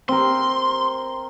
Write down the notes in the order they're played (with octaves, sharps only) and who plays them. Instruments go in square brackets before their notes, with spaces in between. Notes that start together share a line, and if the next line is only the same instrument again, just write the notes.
[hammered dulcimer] C4 A#4 [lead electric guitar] C6